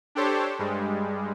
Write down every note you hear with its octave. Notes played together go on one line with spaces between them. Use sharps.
D4 G4 A4 C5 C#5
G2 G3 G#3